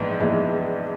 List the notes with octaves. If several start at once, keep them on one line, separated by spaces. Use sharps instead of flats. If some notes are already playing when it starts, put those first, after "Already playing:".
Already playing: A#1 G#2 E3 G#3 B3
A#1 G#2 E3 G#3 B3